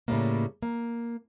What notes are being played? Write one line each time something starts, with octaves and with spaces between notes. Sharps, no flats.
A2 C#3 E3 G3 A3 A#3
A#3